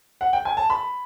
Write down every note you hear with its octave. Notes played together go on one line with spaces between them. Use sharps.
F#5
G5
G#5
A5
B5